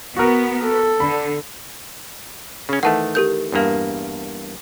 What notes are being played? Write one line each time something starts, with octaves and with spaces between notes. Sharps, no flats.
B3 F#4 A#4
A4
D3 B5
C#3 C#4
D#3 E3 A3 F#5 A5
G4 A#4 G6
E2 G2 A#3